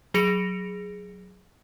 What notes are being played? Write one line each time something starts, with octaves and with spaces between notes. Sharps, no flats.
F#3 G#4 A#6 C#7 D7 F7